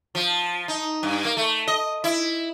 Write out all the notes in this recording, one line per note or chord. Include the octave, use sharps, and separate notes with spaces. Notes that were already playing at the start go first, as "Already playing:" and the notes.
F3
D#4
G2
A#3
A3
D#5
E4